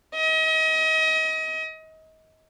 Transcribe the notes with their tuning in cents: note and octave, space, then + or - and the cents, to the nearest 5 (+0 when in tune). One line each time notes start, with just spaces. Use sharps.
D#5 +35